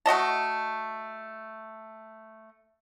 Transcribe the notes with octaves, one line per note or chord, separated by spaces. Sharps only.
A3 F#4 D#5 A5